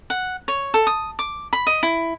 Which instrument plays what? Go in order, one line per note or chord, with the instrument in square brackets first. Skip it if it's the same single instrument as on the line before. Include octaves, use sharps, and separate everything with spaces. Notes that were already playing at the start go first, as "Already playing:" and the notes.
[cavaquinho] F#5
C#5
A4
D#6
D6
B5
D#5
E4